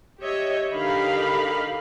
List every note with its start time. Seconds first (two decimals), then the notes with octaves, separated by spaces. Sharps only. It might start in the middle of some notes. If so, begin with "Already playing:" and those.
0.21 G4 C#5 D#5 E5
0.73 D3 D#4 G4 A#4 F5 B5